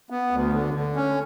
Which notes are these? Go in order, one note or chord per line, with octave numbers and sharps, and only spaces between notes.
B3
D2
D3
D3
C#4